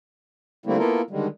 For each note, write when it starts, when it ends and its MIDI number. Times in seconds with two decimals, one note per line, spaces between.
0.66 0.78 50
0.66 0.78 55
0.66 0.78 57
0.66 0.78 58
0.66 0.78 60
0.66 0.78 64
0.78 1.01 58
0.78 1.01 59
0.78 1.01 64
0.78 1.01 65
0.78 1.01 69
0.78 1.01 70
1.10 1.27 50
1.10 1.27 51
1.10 1.27 55
1.10 1.27 56